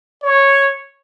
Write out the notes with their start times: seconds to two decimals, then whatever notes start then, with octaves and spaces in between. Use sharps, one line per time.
0.23 C#5